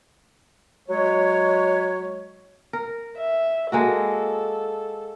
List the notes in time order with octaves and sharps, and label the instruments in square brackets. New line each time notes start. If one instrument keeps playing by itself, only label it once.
[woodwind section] F#3 G#3 C#5
[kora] A#4
[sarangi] E5
[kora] G#3 A#3 F#4 [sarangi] A4